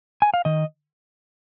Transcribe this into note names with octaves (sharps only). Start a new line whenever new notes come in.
G#5
F5
D#3 D#5